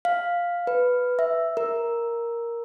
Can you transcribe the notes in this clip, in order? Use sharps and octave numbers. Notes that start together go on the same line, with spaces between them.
F5
B4
E5
A#4